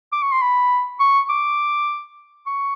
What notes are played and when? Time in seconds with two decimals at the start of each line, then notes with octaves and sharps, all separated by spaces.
0.13 D6
0.22 C#6
0.32 C6
0.41 B5
1.00 C#6
1.29 D6
2.46 C#6